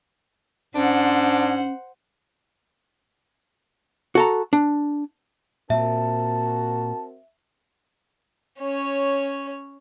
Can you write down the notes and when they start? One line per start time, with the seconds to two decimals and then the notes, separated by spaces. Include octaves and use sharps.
0.75 G#2 C#4 D4 C5 F#5
4.15 F#4 A4 A#5
4.53 D4
5.70 A#2 C4 F#4 A#4 E5 A5
8.60 C#4 C#5